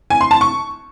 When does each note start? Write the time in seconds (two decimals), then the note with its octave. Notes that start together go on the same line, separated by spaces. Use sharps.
0.10 G#5
0.21 C6
0.31 A5
0.41 C#6